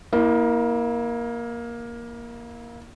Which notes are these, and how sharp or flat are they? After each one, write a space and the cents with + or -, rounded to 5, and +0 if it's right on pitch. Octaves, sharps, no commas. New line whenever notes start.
A#3 +15 E4 -30